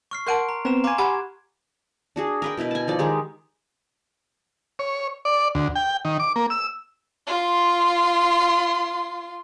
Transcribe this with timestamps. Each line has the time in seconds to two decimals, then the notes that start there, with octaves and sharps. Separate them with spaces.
0.11 C#6 F6 C7
0.27 A#4 F#5 A5 C6 F#6 D7
0.49 A#5
0.65 B3 C4 B4 A#5 E7
0.84 F5 G#5 A#5 C6 D6
0.98 G4 F#5 G#5 B5 C6 G#6
2.16 D4 F#4 G#4
2.42 A#4 B4 G5
2.57 B2 E4 A#4 B4
2.71 G#5 A5
2.88 F3 D#4 D5
2.99 D#3 G#3 G4
4.79 C#5
5.25 D5
5.55 D2
5.75 G5
6.05 D#3
6.20 D6
6.36 A#3
6.50 E6
7.27 F4 C6